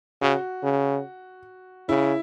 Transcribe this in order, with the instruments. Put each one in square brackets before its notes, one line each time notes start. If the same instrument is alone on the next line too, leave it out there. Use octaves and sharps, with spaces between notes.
[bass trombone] C#3 [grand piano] F#4
[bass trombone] C#3
[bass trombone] C#3 [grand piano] E4